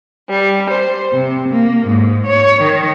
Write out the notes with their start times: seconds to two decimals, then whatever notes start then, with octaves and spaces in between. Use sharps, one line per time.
0.29 G3
0.70 C5
1.12 C3
1.48 A#3
1.86 G#2
2.26 C#5
2.61 D#3